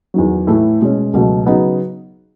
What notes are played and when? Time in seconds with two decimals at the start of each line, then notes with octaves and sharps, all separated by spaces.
0.14 E2 D#3 F#3
0.47 A2 E3 A3 E4
0.80 B2 G#3 C#4
1.13 C#2 B2 F#3 A3
1.46 C#3 F#3 B3 D#4 F#4